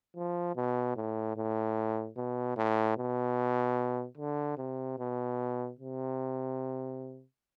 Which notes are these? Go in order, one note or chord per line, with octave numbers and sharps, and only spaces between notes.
F3
B2
A2
A2
B2
A2
B2
D3
C3
B2
C3